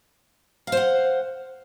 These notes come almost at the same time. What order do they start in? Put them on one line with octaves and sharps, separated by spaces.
F5 C5 F#5